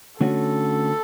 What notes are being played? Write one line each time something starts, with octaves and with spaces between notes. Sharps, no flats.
D3 A3 C#4 F#4 A4